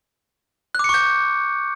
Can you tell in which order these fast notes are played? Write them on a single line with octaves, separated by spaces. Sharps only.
F#6 D6 C#7 C#6 G6